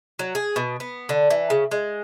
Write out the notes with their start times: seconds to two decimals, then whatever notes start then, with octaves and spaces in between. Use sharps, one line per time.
0.19 F#3
0.35 G#4
0.56 B2
0.80 B3
1.09 D3
1.30 E3
1.50 C#3
1.71 G#3